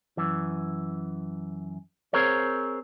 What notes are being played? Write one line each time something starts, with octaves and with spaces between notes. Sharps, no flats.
F#2 E3
C4 G#4 A#4 C5 C#5